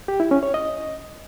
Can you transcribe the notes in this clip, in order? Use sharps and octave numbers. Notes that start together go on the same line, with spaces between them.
G4
E4
C#4
C#5
D#5